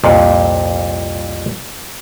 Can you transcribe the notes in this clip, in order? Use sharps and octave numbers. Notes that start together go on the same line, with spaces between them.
C2 F2 A#2